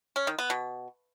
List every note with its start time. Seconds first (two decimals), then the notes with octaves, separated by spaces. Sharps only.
0.16 C#4
0.27 D#3
0.39 B3
0.50 B2